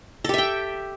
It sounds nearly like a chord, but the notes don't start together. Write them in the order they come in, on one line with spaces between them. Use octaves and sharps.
A4 G4 E5 G5